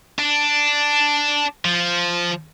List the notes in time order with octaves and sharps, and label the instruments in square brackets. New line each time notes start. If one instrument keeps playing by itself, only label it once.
[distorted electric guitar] D4
F3